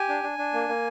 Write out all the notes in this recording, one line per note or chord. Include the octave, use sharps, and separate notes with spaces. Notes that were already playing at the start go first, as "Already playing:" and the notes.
Already playing: G4 G#5
D4
D4
D4
A#3
A#3